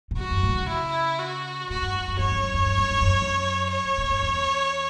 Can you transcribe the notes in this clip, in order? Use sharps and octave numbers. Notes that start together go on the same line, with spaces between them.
A2
G2 F#4
F#2
A2
C#3
E4
F#4
A2 F#4
G2
F#2
F#2
G2 C#5
F#2
G2
F#2
G2
F#2
G2
F#2
F#2
C#5
G2
A2
G2
E2